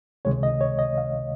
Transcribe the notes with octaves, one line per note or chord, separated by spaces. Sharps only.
C#2 C3 D#3 G#3 C#5
D#5
C#5
D#5
F5